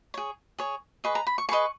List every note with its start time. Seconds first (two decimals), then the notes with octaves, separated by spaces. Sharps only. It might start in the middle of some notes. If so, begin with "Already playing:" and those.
0.14 G#4 C#5
0.58 G#4 C#5
1.04 G#4 B4 D#5 C#6
1.15 A#5
1.27 B5
1.38 C#6
1.49 G#4 B4 D#5 C#6